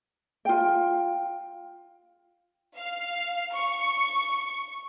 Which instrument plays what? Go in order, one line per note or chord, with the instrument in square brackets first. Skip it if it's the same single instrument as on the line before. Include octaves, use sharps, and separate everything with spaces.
[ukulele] F4 G5
[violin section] F5
C#6